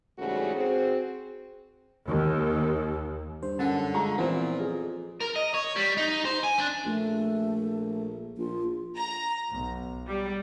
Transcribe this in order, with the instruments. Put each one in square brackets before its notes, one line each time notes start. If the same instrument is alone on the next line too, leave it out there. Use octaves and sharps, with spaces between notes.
[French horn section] G#2 C#3 E3 G3 A3 F#4
C4 F#4 G#4
[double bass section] D#2
[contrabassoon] G2 [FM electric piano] C5
[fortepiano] F#2 [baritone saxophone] D3 [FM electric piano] C#4 F#5 A5
[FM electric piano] G#3 C#6 [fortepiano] F4 A#5
[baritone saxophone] A#2 [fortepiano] E3 C4 F4 [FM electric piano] F3 B3
[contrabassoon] F2 [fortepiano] G#4
[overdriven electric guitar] A#4
D#5
C#5
G3
D#4
C5
G#5
D4
[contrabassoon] A#1 [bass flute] A3
[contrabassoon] A#1 [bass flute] F4
[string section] A#5
B1
G3